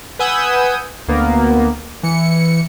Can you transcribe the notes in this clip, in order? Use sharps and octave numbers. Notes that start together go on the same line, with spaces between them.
B4 F#5 G#5 D#6 E6 G6
D2 A#3 B3
E3 C#7